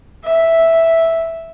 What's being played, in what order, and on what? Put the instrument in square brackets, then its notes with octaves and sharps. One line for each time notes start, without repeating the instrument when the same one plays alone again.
[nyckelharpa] E5